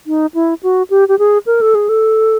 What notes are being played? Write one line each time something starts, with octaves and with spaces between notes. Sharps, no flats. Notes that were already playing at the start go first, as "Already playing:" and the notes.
D#4
E4
F#4
G4
G4
G#4
A#4
A4
G#4
A4